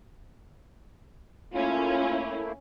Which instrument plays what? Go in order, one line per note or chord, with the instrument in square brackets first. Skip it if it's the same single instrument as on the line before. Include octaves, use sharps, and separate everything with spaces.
[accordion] A3 A#3 E4 [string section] C#4 [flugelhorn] F4